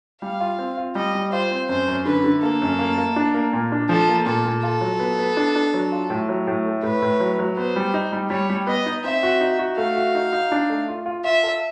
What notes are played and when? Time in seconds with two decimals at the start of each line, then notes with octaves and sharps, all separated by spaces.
0.22 G3 F5
0.40 F4
0.59 C4
0.77 F4
0.95 G3 D#5
1.15 G3
1.32 F4 C5
1.51 C4
1.69 F#2 C5
1.88 F#2
2.06 D3 B4
2.24 D3
2.42 A#3 A4
2.62 F#2
2.79 A#3
2.98 A#3
3.16 D4
3.34 A#3
3.53 A#2
3.72 D4
3.89 F3 A4
4.08 A#3
4.26 A#2 A4
4.45 A#2
4.63 F4 A4
4.81 F#3
5.00 B3
5.19 B3
5.37 D4
5.56 D4
5.74 F#3
5.92 F4
6.10 A2
6.29 F#3
6.47 A2
6.65 A3
6.83 A2 B4
7.02 A2
7.20 F#3
7.39 F#3
7.57 B3 C5
7.76 G3
7.94 D#4
8.12 G3
8.30 G3 C#5
8.50 G3
8.67 B3 D#5
8.86 D#4
9.04 C4 E5
9.23 F#4
9.41 D#4
9.59 F#4
9.77 A3 F5
9.96 F#4
10.15 D#4
10.33 D#4
10.52 D4
10.70 A3
10.88 F4
11.06 F4
11.24 F4 E5
11.43 A4